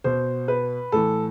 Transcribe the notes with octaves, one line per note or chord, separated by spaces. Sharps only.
B2 C5
B4
A2 E3 A4